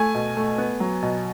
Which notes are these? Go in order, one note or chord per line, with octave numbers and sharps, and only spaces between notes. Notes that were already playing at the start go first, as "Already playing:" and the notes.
Already playing: A3 G#5
B2
A3
B3
F#3
B2